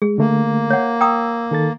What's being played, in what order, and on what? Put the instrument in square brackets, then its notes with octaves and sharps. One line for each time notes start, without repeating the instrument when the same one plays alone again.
[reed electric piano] G#3 [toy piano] G#4
[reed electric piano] D3 A3 [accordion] A#3
[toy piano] C#5 F#5
[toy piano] G5 A#5 D#6 [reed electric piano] E6
[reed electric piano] D#3 A4 A6